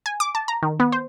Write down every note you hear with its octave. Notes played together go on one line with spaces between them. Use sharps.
G#5
D6
A5
A#5
D#3
B3
C5